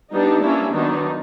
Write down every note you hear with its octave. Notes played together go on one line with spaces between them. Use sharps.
G3 B3 D4 D#4
G3 A#3 C#4 D4 E4
D#3 F#3 B3 D4 D#4